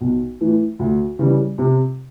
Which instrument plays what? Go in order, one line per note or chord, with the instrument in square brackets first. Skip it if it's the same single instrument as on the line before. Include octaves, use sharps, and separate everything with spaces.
[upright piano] B1
A2 E3
D2
C#3 E3 G3
C3